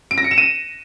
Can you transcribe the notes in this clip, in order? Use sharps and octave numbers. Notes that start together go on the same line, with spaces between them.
D7
A#6
C#7
E7
D#7